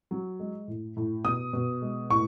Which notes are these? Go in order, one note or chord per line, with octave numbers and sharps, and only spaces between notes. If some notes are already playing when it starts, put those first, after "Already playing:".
F#3
G#3
A2
A2
B2 D#6
B2
G#3
A2 C#6